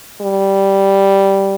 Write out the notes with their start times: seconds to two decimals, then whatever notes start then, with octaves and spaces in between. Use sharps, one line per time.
0.21 G3